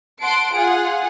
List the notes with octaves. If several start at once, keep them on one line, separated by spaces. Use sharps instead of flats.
F#5 A5 C6 D7
F4 G#4 F#5